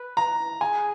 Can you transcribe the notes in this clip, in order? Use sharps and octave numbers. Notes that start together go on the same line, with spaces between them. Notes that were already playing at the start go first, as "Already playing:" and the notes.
Already playing: B4
A#5
G#4 G#5